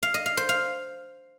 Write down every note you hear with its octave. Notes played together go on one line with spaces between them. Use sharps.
F5
D#5
F5
C5
F5